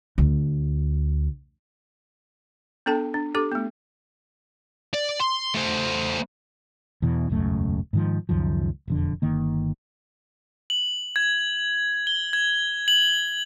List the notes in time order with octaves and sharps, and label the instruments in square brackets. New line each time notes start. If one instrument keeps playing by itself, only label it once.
[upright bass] D2
[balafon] B3 D4 A4 G5 A5
D4
D4 G4 A4 D6
A3 B3
[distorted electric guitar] D5
C6
A3 C5
[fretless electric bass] E2 B2 E3
E1 C#2 F#2 A3
G#2 D#3 F3
C#2 F#2 D#3 F3
E1 F2 D3
G1 D#3 A#3
[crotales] F#7
G#6
G7
G#6
F#7